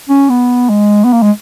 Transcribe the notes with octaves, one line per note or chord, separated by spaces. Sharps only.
C#4
B3
G#3
B3
A#3
G#3